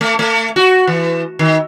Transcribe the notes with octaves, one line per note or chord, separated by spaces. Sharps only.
A3
A3
F#4
E3
D#3